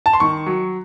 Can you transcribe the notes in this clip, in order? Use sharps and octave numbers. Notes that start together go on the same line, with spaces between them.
A5
C6
D#3 C#6
F#3